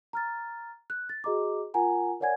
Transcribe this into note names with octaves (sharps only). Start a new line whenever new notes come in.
A#5 F6 A6
F#6
A6
F#4 G#4 D#5 A#5 D6
F4 A#4 F#5 G#5 A#5
A#4 C#5 D5 F#5 G#5 G#6